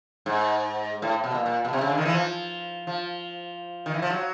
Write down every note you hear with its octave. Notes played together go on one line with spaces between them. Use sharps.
G#2
A2
B2
A#2
A#2
B2
C3
C#3
D3
D#3
E3
F3
F3
D#3
E3
F3
F#3